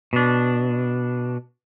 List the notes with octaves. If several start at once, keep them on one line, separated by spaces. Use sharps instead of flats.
B2 D4